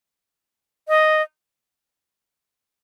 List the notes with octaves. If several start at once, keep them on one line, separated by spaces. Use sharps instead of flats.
D#5